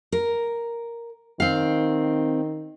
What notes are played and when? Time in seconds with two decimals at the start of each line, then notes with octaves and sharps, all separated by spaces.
0.12 A#4
1.40 D#3 C4 F5